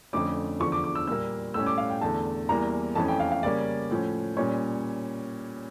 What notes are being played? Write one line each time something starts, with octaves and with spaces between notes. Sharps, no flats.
F2 D3 A3 C#4 D6
E2 D3 F3 C#6
D6
D6
E6
A#2 G3 A#3 E6
A2 G3 C#4 E6
D6
F5
G5
E2 D3 A3 A5
E2 E3 G3 A#3 A#5
F2 E3 A3 C#4 A5
G5
F5
F5
C#3 G3 A#3 C#4 D5
A2 F3 C#4
A#2 G3 C#4 C#5